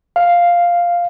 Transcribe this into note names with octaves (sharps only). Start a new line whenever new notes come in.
F5